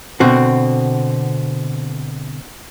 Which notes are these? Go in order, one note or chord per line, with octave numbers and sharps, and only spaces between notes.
B2 D3 C4 F#4